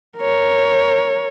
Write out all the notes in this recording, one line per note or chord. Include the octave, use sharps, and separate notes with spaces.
A#4 C#5